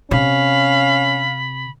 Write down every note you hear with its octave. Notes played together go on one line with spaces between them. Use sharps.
C3 C#4 F5 B5